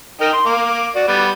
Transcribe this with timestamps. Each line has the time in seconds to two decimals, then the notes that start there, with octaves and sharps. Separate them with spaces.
0.21 D#4 A#4 G5
0.33 C6
0.46 A#3 D6
0.95 F#4 D5
1.08 G3 B3